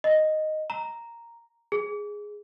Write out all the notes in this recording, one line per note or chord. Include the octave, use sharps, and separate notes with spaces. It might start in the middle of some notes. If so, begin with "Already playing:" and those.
D#5
A#5
G#4